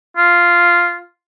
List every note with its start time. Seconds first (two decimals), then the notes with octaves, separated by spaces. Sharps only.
0.17 F4